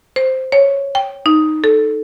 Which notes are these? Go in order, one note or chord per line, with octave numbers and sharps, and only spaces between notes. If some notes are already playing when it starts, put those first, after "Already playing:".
C5
C#5
G5
D#4
A4